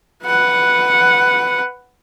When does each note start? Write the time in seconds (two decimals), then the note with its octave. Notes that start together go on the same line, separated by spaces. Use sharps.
0.25 B4 F#5